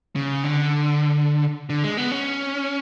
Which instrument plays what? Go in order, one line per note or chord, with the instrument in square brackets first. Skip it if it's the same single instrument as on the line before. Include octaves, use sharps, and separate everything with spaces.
[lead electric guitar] C#3
D3
D3
G#3
B3
C#4